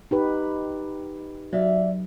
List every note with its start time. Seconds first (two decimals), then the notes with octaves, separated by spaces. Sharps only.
0.11 D#4 G4 B4
1.53 F#3 D5 E5 F5